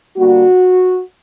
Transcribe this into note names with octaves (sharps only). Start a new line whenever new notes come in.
D3 G3 A#3 F#4